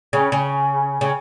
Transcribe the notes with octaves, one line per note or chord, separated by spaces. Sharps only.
C#3
C#3
C#3